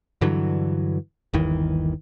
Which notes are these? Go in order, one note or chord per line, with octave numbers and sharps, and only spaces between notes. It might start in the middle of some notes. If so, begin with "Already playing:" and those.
G2 D3 E3 F#3
G1 D#2 D#3 E3